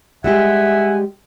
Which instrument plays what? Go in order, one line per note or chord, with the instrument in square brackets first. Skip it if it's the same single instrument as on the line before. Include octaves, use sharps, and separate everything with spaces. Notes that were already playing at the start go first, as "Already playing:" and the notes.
[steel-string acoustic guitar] G3 G#3 G4 [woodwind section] E5 F#5 G#5